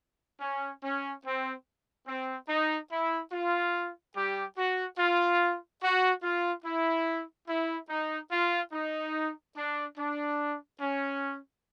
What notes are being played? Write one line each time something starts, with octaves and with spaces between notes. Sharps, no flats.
C#4
C#4
C4
C4
D#4
E4
F4
G3 G4
F#4
F4
F#4
F4
E4
E4
D#4
F4
D#4
D4
D4
C#4